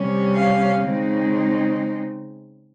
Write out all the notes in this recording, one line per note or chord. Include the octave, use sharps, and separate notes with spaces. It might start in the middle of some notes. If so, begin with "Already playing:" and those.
Already playing: C3 G3 C#4
F5
C#3 G#3 C4 D#4